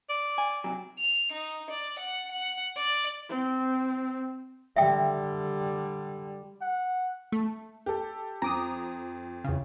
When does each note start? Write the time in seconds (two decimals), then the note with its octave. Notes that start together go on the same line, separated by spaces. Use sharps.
0.10 D5
0.38 G#5
0.64 C3 F#3
0.99 F7
1.32 D#4
1.70 D5
1.99 F#5
2.31 F#5
2.76 D5
3.29 C4
4.76 D3 G3 E5 G5
6.62 F#5
7.32 A3
7.86 G4 A4
8.42 F2 A#5 D6 D#6
9.44 E2 C#3